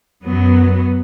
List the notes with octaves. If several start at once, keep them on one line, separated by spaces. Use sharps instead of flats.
F#2 F#3 B3